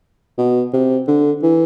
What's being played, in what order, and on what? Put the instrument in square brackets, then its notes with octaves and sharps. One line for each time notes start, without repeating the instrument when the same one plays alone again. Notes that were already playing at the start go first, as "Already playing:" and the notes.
[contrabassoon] B2
C3
D3
E3